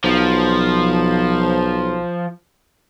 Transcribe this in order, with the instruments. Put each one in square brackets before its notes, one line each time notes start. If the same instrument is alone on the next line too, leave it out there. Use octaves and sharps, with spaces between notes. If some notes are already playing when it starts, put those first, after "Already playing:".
[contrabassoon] B1 [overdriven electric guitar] F3